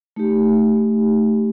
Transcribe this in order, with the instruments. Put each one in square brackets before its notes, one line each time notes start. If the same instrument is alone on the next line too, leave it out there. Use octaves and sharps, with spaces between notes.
[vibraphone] A3 D#4 G4